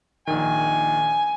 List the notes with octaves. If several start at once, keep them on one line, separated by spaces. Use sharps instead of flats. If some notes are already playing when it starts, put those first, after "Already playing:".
A#1 D#3 G#5